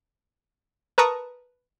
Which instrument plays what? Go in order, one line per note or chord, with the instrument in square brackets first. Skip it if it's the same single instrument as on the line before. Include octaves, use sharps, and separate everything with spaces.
[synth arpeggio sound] A#4 B4 A5 A#5 C#6 D#6